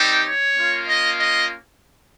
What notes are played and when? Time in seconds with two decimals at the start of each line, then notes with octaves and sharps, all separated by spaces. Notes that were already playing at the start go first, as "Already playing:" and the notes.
Already playing: G3 C4 D#4 G4
0.23 C#5
0.55 A#3 C#4 F4
0.86 D#5
1.16 D#5